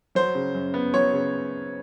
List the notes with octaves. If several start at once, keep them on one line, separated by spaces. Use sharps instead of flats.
F#3 C5
C#3
F#2
B3
F#3 C#5
C#3